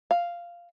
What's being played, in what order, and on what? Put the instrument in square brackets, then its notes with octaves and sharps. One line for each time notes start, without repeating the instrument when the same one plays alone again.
[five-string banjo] F5